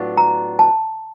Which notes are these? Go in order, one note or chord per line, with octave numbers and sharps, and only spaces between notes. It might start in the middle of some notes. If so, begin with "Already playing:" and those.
Already playing: A2 F#3 B3 D4 F4
A#5
A5